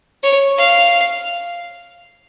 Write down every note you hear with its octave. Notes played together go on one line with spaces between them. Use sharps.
C#5
F5